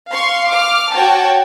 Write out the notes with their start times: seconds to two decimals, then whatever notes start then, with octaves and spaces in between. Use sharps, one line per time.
0.10 F5 C6 C#6
0.49 D6 F6
0.93 F#4 C#5 G5 A5